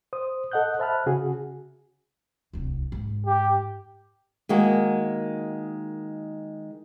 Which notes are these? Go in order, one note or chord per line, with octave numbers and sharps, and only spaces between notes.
C5 D#6
A4 D#5 F#5 F#6 G6
C5 E5 A5 B5 F6 F#6
C#3 F#4 G#4
D1 C2
G#2
G4
D#3 G#3 A#3 F#4